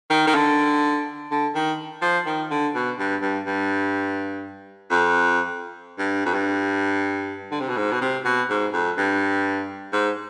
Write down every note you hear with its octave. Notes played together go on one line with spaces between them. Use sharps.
D#3
D#3
D3
D3
D#3
F3
D#3
D3
B2
G2
G2
G2
F2
G2
F2
G2
D3
C3
B2
G#2
B2
C3
B2
G#2
F2
G2
G#2